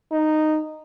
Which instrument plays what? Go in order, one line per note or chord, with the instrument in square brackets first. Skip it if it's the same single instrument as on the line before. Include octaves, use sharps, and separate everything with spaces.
[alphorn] D#4